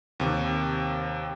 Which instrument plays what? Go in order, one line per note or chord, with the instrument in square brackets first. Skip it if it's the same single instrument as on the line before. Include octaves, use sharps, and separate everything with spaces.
[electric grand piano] D#2 C3